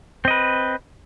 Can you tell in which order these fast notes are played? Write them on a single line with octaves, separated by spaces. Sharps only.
C4 D#5 B4